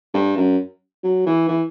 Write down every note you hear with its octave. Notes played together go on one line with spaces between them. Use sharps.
G2
F#2
F#3
E3
E3